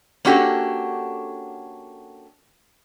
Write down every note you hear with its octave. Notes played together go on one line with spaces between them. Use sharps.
A#3 C#4 D4 F#4 G4 A4